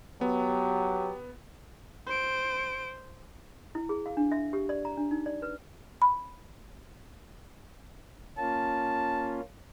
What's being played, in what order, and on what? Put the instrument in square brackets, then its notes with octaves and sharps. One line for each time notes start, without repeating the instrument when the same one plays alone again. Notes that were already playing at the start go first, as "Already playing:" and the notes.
[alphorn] F#3 [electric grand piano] B3 [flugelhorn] G4
[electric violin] C5 D7
[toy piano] E4
G#4
F5
D4
E5
G4
D5
A#5
D4
D#4
D5
B4
[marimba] B5
[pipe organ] A#3 C#4 F4 [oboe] A5